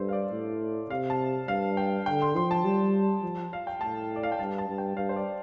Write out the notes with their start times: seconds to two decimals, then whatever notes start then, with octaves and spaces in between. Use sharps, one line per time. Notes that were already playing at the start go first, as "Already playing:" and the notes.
Already playing: G2 A4 C5
0.09 F5
0.13 D5
0.32 A2
0.90 C3 F5
1.10 A5
1.48 G2 F5
1.77 G5
2.06 D3 G5
2.22 C6
2.35 F3 C6
2.51 A5
2.65 G3
3.23 F3
3.53 F5
3.67 G5
3.81 A2 A5
4.16 D5
4.23 F5
4.32 G5
4.39 G2 A5
4.58 A5
4.68 G2
4.78 G5
4.97 G2 F5
5.09 C5
5.16 D5